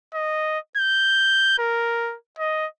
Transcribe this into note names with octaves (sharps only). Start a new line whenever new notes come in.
D#5
G6
A#4
D#5